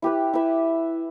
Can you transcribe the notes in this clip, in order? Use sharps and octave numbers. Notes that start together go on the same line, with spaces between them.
E4 G4 B4
E4 B4 E5